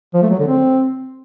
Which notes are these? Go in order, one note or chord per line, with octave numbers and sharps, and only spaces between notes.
F3
A3
F#3
D3
C4